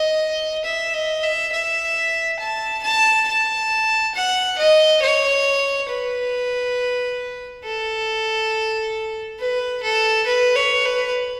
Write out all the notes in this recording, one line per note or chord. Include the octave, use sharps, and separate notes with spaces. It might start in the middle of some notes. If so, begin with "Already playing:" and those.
Already playing: D#5
E5
D#5
E5
E5
A5
A5
A5
F#5
D#5
C#5
B4
A4
B4
A4
B4
C#5
B4